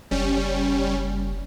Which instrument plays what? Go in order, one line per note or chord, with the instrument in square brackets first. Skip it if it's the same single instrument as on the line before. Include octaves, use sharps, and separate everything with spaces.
[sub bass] F#1 [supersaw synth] G3 C#4